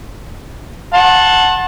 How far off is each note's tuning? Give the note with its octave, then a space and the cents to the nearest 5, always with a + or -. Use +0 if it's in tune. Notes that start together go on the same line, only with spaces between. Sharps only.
F#5 -5 A5 +0 C6 +45